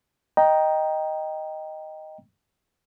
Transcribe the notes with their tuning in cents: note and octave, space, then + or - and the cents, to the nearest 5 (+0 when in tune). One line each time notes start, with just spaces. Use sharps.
D#5 +0 G5 +0 A#5 +5